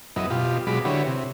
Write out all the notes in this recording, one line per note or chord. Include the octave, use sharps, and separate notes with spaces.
F#2 B3 E4 D#5
B2 F4 G4
B2 F#3 G#3 B5 D6
D3 E4 F#4 G4 B4 C#5
C3